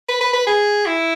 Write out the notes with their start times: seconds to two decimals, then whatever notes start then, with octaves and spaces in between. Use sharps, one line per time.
0.09 B4
0.21 B4
0.33 B4
0.47 G#4
0.86 E4